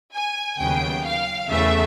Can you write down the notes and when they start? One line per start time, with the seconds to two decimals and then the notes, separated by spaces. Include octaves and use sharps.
0.14 G#5
0.59 D#2 C#3 F#3 B3 G5
1.04 F5
1.50 E2 C#3 E3 A3 E5